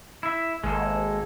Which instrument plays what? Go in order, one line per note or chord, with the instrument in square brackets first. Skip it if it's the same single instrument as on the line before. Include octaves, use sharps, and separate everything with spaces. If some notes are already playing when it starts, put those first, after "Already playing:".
[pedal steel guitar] E4 E5
[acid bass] G#1 [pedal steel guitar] G#3 A#3 A4